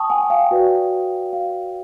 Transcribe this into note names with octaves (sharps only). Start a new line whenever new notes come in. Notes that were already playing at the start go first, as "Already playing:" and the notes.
Already playing: G5 A5 C#6 D#6
F#5 G#5
F5 G5
F#4 B4 D5
F5